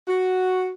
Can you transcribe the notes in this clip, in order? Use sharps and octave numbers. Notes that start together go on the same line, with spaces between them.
F#4